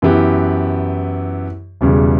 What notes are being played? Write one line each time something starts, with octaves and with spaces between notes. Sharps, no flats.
F#2 E3 B3 E4 G4
E1 E2 C#3 G3